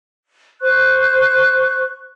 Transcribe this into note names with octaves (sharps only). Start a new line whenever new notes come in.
C5 C#6 F#6